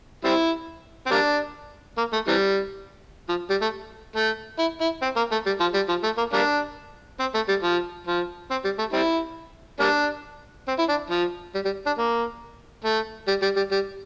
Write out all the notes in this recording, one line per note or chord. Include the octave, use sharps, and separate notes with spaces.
G3 C4 E4
C4
G3 A#3 D4
A#3
A3
C3 E3 G3
F3
G3
A3
A3
E4
E4
C4
A#3
A3
G3
F3
G3
F3
A3
A#3
G3 A#3 D4
C4
A3
G3
F3
F3
C4
G3
A3
G3 C4 E4
G3 A#3 D4
C4
E4
D4
F3
G3
G3
D4
A#3
A3
G3
G3
G3
G3